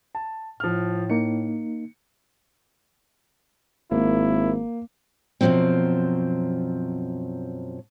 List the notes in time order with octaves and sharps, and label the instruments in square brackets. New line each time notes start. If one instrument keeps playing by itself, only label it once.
[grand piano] A5
[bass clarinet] A2 [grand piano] F3 F6
[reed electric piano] A#3 D#4 [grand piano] C#7
[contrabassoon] G#1 [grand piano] A#3 [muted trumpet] E4
[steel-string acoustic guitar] F#2 B2 D3 F3 F#3 C4